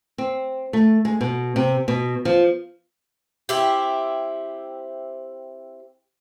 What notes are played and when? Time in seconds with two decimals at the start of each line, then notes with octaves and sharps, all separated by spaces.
0.18 C4
0.73 A3
1.05 G#3
1.21 B2
1.56 C3
1.88 B2
2.25 F3
3.49 C4 E4 G4